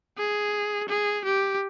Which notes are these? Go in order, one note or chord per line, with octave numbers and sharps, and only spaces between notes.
G#4
G#4
G4